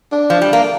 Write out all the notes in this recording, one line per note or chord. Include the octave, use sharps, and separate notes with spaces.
D4
F3
G3
A#3